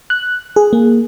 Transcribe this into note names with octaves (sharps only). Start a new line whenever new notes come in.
F#6
G#4
A#3